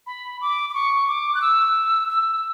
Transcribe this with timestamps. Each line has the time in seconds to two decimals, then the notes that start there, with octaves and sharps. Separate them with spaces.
0.07 B5
0.41 D6
0.70 D6
0.74 C#6
1.09 D6
1.35 F#6
1.42 E6
2.10 E6